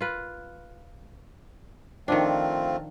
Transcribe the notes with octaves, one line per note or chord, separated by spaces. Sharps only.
F4 B4
D#3 F3 A3 C4 D4 F4